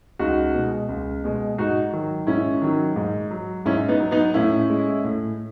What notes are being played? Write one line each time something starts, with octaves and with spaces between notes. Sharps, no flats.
C#2 D#4 F#4
B2 G#3
C#2
B2 G#3
G#2 D#4 F#4
D#3 F#3
G#2 C#4 E4
D#3 F#3
G#2
F#3
G#2 C#4 E4
B3 D#4
F#3
B3 D#4
A2 C#4 E4
G#3
A2